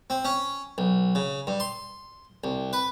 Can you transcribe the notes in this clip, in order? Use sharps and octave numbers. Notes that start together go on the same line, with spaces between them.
C4
C#4
B1
C#3
G2
C6
C2
B4